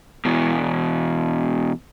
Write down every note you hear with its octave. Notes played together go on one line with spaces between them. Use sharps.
E2 B2